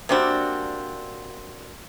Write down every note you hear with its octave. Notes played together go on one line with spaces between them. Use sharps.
C3 G3 A#3 C4 D4 F#4